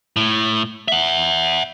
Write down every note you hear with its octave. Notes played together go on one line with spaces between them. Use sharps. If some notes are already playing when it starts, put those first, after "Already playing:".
A2
E5 F#5